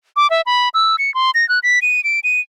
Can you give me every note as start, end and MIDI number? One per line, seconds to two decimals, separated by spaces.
0.16 0.30 86
0.30 0.41 76
0.46 0.69 83
0.74 0.96 88
0.99 1.13 97
1.14 1.31 84
1.35 1.47 94
1.49 1.59 90
1.63 1.79 95
1.82 2.03 99
2.04 2.20 98
2.24 2.40 99